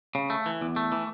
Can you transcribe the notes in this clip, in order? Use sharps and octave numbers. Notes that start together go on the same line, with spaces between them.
C#3
A3
E3
E2
A3
E3